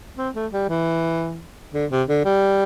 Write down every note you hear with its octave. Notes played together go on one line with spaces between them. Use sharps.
C4
A3
G3
E3
D3
C3
D3
G3